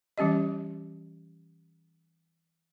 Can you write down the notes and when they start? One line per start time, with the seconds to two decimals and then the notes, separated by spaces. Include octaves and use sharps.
0.18 E3 G3 C#4 G4 D#5